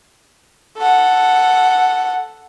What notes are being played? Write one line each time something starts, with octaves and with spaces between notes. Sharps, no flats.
A4 F#5